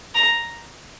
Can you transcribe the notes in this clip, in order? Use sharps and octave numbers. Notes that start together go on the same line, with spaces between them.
A#5